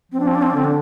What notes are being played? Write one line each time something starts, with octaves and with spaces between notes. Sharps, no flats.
F3 C4
D4
C4
D4
C4
D4
D3 C4
D4